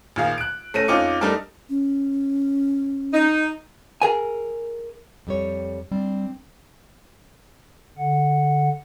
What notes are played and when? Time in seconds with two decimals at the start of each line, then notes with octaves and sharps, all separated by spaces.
0.16 A#1 D#3 G#4 F5
0.38 F#6 D7
0.74 A3 C#4 A#6 D#7
0.88 F2 C#4 D#4 F4 D6 C#7
1.21 G3 A3 D4 D#4 A#4
1.69 C#4
3.14 D#4
4.02 G#4 A#4 G#5
5.27 F2 G3 C#5
5.91 G3 C4 D4
7.97 D3 F#5